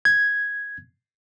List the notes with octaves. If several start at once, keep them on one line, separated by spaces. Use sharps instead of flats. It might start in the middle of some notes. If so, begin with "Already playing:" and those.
G#6